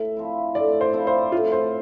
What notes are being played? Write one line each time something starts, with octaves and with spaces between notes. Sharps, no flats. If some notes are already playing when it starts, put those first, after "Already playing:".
Already playing: A2 E5
F3 C4 E4
A2 D5
C5
F3 C4 E4
C5
A2 F4
C5